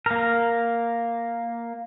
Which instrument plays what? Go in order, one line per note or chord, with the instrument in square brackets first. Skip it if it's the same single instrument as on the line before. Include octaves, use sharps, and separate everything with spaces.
[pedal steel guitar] A#3 A#4